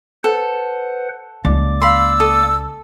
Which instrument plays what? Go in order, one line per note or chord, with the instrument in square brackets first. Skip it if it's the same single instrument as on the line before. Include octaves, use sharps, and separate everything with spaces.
[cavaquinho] A4 [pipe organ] B4 C5 F#5
[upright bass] C#2 [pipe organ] A#3 D5 D6
[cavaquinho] F5 B5 C6 [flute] E6
[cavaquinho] A4 D#6